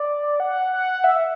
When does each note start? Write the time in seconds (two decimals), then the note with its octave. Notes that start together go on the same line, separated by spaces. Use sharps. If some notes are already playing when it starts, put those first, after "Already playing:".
Already playing: D5
0.40 F#5
0.72 F#5
1.04 E5